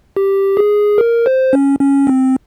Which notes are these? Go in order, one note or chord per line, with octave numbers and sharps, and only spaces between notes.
G4
G#4
A#4
C5
C#4
C#4
C4